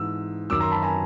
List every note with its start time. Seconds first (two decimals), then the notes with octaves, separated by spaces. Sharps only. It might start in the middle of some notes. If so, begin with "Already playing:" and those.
Already playing: G#2 E3 E6
0.50 F#2 D#3 F#3 D6 E6
0.60 A#5 C6
0.71 A5 B5
0.83 G#5 A#5